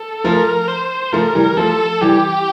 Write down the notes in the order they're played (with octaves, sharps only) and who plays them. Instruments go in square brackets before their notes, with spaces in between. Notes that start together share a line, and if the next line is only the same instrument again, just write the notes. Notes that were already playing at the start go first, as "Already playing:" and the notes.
Already playing: [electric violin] A4
[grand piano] F3 A3 [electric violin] A#4
[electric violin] C5
[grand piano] F3 A3 [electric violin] A#4
[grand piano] E3 G3
[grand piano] F3 A3 [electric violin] A4
[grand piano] E3 G3 [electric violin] G4